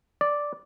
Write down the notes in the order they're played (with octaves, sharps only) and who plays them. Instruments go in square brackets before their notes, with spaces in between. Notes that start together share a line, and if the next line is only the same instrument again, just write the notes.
[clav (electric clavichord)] D5